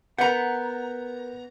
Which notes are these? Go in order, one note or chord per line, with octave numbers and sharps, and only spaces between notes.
B3 A#4 B4 F#5 A#5 G6